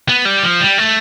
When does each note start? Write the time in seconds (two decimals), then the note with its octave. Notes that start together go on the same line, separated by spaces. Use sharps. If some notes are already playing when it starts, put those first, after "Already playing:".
0.09 B3
0.25 G3
0.43 F3
0.60 G3
0.78 A3